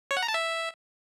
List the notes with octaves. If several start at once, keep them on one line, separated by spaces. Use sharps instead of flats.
C#5
F#5
A#5
A5
E5